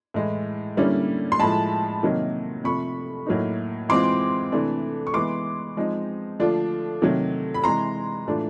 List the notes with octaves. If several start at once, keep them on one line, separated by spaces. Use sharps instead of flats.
A2 E3 G#3
D3 G3 A#3 C#4 E4
C6
A2 F3 G#3 A5 B5
C3 D#3 F#3 A#3 D#4
C3 F3 A3 B5 C#6
A2 F#3 A#3 D#4
E3 G#3 C4 F4 C6 D6
C3 E3 A3 D4
C#6
E3 G#3 B3 E4 C6 D6
F3 G#3 C4 D#4
D3 F3 A3 D4 F4
C3 D#3 F#3 A3
B5
C3 E3 G#3 A#5 C6
A2 E3 A3 D4 F4